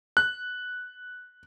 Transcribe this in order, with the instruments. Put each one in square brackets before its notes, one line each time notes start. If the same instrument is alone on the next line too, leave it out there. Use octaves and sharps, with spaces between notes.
[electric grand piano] F#6